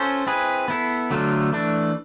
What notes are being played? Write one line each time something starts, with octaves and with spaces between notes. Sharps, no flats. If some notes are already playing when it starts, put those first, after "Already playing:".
Already playing: C#4 F4 A4 C5
C4 E4 G#4 B4
B3 E4 A4
D3 F#3 A3 D4 F4
E3 A3 D4